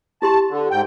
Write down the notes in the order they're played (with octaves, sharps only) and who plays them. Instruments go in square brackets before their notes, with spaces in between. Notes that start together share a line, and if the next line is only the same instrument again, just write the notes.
[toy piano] E4 G4 C6 [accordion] A5
[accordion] D3
G#2 G5